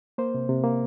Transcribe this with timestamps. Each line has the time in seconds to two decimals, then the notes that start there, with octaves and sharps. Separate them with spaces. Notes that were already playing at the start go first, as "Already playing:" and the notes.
0.18 A#3 C5
0.35 C3
0.49 C3
0.64 A#3